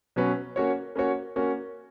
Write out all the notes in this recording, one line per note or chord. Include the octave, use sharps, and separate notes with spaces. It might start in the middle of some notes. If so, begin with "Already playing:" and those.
B2 F#3 C#4 F#4 B4
A#3 C#4 F#4 C#5
A#3 C#4 F#4 C#5
A#3 C#4 F#4 C#5